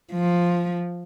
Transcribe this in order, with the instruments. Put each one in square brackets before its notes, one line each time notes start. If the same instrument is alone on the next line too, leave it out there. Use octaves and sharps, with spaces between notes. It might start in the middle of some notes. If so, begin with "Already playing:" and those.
[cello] F3